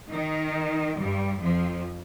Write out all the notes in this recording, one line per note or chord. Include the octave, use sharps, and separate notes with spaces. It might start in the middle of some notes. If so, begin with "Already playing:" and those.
D#3 D#4
G2 G3
F2 F3